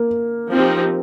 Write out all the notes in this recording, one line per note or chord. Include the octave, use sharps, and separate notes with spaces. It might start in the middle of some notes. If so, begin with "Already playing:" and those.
Already playing: A#3
F3 C4 D#4 G4